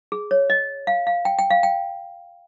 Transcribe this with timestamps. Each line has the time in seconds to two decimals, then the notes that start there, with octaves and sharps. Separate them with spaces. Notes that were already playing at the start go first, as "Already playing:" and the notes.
0.12 G#4
0.31 C#5
0.50 D#5
0.87 F5
1.07 F5
1.25 G5
1.38 G5
1.51 F5
1.63 G5